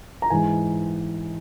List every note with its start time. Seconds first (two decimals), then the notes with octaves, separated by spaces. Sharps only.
0.22 A#5
0.30 G#2 E3 G#3 G#5